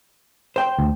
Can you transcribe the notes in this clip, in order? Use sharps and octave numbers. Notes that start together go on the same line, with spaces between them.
C5 G5
D2